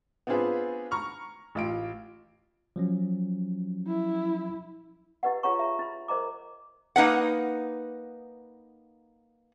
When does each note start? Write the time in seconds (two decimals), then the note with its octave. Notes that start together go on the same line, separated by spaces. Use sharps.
0.27 B3 C4 D4 F4 G#4 B4
0.91 A#5 C#6 F6
1.55 A1 F4 D7
2.76 F3 F#3 C#4
3.88 E4
5.23 E4 G4 B4 D#5 F#5
5.43 F4 G#4 C#5 F#5 A#5 C#6
5.59 E5 A#5
5.79 E4 B5
6.08 A#4 C5 D#5 A#5 D6
6.96 A#3 D#4 B4 F#5